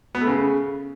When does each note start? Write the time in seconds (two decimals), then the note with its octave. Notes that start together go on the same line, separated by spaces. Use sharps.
0.15 B3
0.21 A3
0.27 C#3